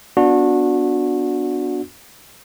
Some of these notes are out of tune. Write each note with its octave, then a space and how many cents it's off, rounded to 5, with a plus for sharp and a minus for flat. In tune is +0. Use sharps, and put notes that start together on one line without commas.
B3 +0 D4 +0 F#4 -25